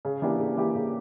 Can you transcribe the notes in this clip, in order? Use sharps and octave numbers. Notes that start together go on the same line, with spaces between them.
C#3
E3 A#3 D4 G4
C#3
E3 A#3 D4 G4
C#3